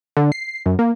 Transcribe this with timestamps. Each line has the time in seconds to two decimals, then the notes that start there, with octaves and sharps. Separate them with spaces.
0.17 D3
0.32 C7
0.66 F#2
0.79 A#3